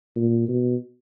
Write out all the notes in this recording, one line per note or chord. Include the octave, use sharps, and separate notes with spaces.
A#2
B2